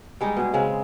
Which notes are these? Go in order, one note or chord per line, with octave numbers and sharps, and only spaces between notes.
G3 G#3 D#4
B2 G#4
C#3 G#3 C4